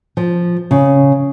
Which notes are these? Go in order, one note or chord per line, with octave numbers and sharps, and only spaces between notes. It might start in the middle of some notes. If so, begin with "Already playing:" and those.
F3
C#3